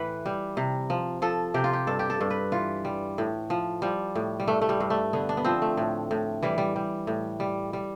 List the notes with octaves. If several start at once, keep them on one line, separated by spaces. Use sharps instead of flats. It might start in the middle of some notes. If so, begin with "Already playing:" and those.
Already playing: A2 E3 B4
G3
C3
F3
F3 A4
C3 G4
F4
G4
G2 A4
G4
A4
G2
B4
E3 F4
G3
A2
F3
F3 G3
A2
G3
G2 A3
A3
G3
G2
A3
D3 B3
D4
B3
F3 C4
A3
A2
A2
E3 G3
G3
G3
A2
G3
G3